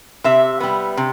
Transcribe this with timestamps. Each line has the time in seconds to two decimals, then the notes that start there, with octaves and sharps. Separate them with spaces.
0.24 C3 E5
0.60 G3 B3
0.97 C3